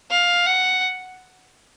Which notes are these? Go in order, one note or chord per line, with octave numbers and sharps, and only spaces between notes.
F5
F#5